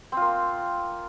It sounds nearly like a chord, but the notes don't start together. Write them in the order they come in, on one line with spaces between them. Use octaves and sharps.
C4 F4 A#3